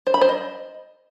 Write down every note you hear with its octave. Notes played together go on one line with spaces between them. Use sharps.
C5
B5
C5
D#5